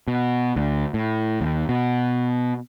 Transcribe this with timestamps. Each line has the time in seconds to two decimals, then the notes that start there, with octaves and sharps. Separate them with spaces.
0.08 B2
0.56 D2
0.94 A2
1.41 D#2
1.69 B2